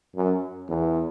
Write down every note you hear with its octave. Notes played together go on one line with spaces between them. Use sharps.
F#2
E2